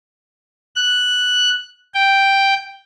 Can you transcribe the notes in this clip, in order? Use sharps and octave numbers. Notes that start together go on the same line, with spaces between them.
F#6
G5